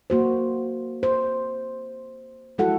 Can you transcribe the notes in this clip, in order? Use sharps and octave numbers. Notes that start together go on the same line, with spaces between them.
A#3 F#4 C5
C5
F3 G#3 E4 F#4 A4 F#5